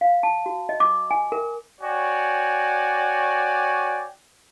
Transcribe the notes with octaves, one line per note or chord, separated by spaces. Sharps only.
F5
A5
F#4
D#5
D6
G#5
A#4
F#4 C#5 D5 G5 G#5